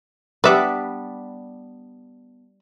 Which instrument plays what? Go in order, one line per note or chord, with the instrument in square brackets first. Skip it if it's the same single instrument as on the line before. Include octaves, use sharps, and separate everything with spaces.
[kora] G3 B3 D4 [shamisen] B4 E5